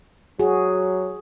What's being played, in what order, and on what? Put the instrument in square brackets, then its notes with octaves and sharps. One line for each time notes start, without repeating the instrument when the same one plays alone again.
[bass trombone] F#3 [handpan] F#4 G#4